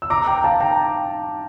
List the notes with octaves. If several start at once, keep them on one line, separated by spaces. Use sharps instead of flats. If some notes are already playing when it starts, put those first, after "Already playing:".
E6
A#5 D6
G5 A#5
F5 A5
G5 A#5